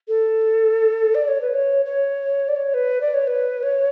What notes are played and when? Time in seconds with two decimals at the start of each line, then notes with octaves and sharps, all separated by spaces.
0.08 A4
1.15 D5
1.28 C#5
1.41 B4
1.54 C#5
1.85 C#5
2.48 D5
2.56 C#5
2.74 B4
3.01 D5
3.14 C#5
3.27 B4
3.63 C#5